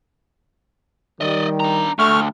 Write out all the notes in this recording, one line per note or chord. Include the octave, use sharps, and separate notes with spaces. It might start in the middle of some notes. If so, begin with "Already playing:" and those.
D#3 G3 D5 D#5
D4 A#5
D2 A3 C#6 F6